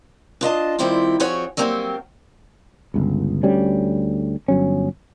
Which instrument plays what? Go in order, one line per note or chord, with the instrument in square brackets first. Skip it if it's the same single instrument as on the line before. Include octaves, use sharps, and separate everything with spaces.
[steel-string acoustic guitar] D4 F4 D#5 A5
D#3 G3 C4 E4 F4
F3 C4 F#4 G#4 C#5
F#3 G3 A#3 C4 G4
[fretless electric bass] G1 C#2
D2 G3 C#4
G1 F#3 C#4